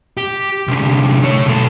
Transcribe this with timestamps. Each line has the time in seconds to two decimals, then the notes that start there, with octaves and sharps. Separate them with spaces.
0.17 G4
0.68 C2 D3
1.23 A3 C#5
1.48 B1 A4